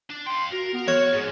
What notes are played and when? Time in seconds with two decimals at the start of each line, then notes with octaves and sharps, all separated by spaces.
0.10 D4
0.26 F5 G5 C6
0.52 F#4 A#4
0.73 B3
0.88 F#4 C#5 F6
1.14 G#2 G#4